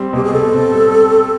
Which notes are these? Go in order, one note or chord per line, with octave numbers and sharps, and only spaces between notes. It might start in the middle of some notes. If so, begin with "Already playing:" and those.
Already playing: G3 C4
B2 G4
G#4
B2 A4
C4
G3